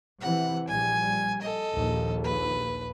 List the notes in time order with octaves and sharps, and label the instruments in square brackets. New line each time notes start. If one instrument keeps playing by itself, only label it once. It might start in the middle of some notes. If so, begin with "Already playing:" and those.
[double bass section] C3 E3 [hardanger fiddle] F#5
[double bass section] A#1 G3 [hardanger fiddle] G#5
[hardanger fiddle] A4 D#5
[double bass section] A#1 D#2
[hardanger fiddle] B4